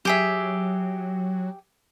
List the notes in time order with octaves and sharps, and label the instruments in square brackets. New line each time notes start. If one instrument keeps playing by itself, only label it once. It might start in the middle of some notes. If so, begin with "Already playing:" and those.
[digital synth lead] F#3 [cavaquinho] G4 G#4 E5